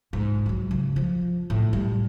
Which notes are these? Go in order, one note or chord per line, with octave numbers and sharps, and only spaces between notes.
G#2
E3 F#3
C#3
F3
A2
G3